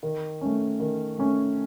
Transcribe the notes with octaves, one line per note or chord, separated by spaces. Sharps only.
D#3
A3 C#4
D#3
A3 C#4